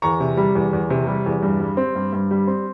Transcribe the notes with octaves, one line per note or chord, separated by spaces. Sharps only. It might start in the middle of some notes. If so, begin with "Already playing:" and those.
E2 A#5 C#6
C3
G3
E2
E2
C3
G3
E2
G2
G3
C4
G2
G2
G3
C4